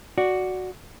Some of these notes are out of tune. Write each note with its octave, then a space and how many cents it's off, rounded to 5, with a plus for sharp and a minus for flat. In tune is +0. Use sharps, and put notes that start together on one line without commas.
F#4 +0 D5 +0